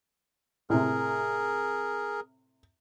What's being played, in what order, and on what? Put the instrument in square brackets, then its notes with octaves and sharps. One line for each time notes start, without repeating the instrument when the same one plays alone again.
[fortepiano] A2 C3 [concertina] G#4 A#4